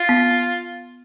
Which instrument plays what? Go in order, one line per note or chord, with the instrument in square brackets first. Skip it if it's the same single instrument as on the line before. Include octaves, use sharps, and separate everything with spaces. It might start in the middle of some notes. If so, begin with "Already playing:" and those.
Already playing: [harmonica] F4
[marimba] B3
B3